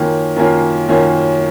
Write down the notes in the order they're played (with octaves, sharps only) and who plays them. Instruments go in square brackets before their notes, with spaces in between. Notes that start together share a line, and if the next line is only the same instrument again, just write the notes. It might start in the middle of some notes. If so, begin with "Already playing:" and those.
Already playing: [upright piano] F#2 D#3 A#3 C#4 F4
F#2 D#3 A#3 C#4 F4
F#2 D#3 A#3 C#4 F4